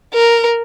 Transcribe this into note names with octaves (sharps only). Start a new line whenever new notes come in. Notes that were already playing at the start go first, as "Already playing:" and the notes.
A#4